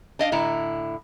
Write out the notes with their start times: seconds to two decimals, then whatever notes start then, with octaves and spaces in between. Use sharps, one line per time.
0.19 D4 D#5 F5
0.32 A2 D3 E4 A#5